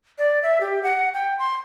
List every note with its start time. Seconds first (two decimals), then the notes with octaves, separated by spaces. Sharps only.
0.18 D5
0.43 E5
0.61 G4
0.83 F#5
1.14 G5
1.39 C6